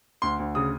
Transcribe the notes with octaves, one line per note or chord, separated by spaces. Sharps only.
D2 C6
D2
C#3 D#6